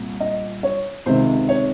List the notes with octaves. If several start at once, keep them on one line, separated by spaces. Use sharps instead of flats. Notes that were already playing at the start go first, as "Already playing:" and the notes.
Already playing: C2 A#2
D#5
C#5
C#2 C3 D#3 C5
C#5